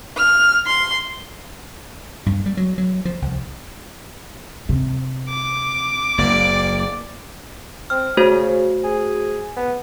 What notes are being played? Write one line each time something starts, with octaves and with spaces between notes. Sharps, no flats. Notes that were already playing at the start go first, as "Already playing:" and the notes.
F6
C6
G2
G3
F#3
F#3
F3
C2
C3
D6
F#1 A#3 D5
C4 F6
C#3 A3 F#4 C5
G#4
B3